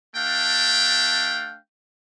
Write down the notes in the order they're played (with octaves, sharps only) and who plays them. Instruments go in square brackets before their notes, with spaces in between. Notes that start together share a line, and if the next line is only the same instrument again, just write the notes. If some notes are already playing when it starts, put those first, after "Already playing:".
[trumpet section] A3 D4 F5 G5